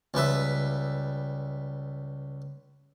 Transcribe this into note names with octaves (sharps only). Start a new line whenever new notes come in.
C#2 G3 B4 E5